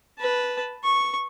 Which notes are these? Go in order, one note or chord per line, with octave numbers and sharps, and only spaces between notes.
B4 A5
C#6